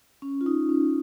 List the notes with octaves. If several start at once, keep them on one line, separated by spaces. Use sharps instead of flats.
C#4
F4
D#4
C#4